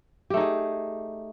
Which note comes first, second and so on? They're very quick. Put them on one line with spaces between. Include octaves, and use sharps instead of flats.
G4 A3 D#4 G#4